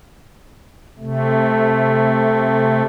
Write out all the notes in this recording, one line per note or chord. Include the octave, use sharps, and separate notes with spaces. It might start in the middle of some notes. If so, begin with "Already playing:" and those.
C3 A3